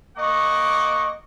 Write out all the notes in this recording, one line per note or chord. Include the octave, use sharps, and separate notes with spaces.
A#3 D#5 F#5 C#6 D6